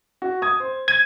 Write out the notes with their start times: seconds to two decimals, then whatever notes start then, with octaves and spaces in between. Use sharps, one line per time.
0.22 F#4
0.42 D#6 G#6
0.60 C5
0.88 G#6 D#7